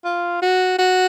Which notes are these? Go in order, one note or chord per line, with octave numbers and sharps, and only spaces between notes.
F4
F#4
F#4